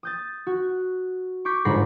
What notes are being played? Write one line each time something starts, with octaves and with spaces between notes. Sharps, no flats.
D#6 G6 A6
F#4
C#6 D6 G6 B6 C#7
G1 G#2 B5 A#6 C7 C#7